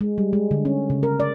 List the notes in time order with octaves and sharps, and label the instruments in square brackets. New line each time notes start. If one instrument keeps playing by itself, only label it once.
[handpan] G#3
G3
G#3
D3
C#4
C#3
A#4
D5